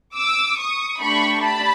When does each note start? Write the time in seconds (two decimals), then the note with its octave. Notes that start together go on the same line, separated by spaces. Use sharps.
0.16 D6 E6
0.58 C#6 D#6
1.01 A3 D4 G4 B5 C#6
1.44 A5 B5